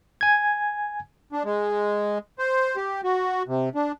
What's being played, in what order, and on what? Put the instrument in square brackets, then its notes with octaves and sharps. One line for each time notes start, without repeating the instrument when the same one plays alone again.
[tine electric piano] G#5 G#6
[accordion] D4
G#3
C5
G4
F#4
C3
D4